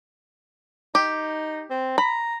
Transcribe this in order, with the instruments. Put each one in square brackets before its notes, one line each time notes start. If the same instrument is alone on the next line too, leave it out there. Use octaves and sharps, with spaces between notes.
[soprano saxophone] D#4 [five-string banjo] G4
[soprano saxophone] C4
[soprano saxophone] A#5 [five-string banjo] B5